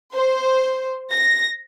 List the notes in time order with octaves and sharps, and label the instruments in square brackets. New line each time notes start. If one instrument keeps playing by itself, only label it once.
[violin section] C5
A#6